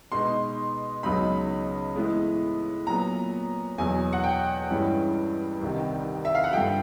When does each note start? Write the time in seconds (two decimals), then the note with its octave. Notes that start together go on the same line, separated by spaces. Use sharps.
0.12 B2 G#3 B3 D#4 C6
1.03 C#2 C#3 F#3 B3 D#4 B5
1.95 A2 E3 G#3 B3
2.87 A#2 F#3 B3 A#5
3.78 E2 B2 F#3 G#5
4.13 F#5
4.24 G5
4.70 G2 E3 G#3 C#4
5.61 C2 C3 D#3
6.25 E5
6.35 F5
6.44 F#5
6.53 G2 D3 F3 G5